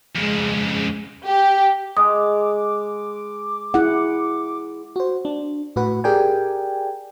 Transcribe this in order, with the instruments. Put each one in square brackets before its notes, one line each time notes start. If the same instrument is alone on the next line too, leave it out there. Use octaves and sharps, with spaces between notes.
[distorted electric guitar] F2 C#3 [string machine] G#3
[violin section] G4
[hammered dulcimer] G#3 [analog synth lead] D6 [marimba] D#6
[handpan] E4 G#4 F#5
[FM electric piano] F#4 C5
D4
A2 F#4 B4 F#5
G4 G#4 A#4 D5 G5 G#5